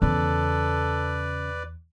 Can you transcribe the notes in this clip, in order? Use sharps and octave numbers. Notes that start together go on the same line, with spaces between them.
E2 C#3 A4 B4 D5